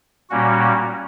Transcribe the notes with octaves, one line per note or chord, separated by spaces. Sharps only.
A#2 G3 A#3 C#4 F#4